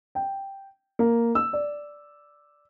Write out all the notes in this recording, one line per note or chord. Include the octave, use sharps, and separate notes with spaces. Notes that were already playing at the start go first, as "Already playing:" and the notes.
G5
A#3
E6
D5